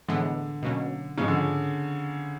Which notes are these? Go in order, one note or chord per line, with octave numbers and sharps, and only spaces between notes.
A2 D3 E3 G#3 B3
B2 F#3 A#3 C#4
G#2 C#3 F3 G#3 C#4
D3